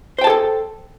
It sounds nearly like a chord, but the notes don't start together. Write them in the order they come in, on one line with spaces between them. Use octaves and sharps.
C5 G5 A5 G#4 A4